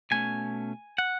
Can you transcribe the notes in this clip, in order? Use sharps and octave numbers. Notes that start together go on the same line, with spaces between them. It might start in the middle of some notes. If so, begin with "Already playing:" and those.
B2 A3 C#4 G#5
F#5